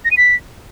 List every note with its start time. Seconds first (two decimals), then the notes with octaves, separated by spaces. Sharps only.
0.05 A#6
0.11 D#7
0.17 B6